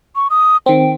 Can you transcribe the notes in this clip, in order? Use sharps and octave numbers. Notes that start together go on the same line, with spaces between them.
C#6
D#6
D#3 C4 G5